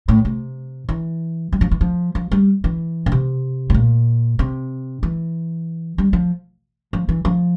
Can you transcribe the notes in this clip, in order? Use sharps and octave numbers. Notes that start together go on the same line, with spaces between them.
A2
C3
E3
G3
F3
E3
F3
F3
G3
E3
D3
C3
A2
A#2
C3
E3
G3
F3
F3
E3
F3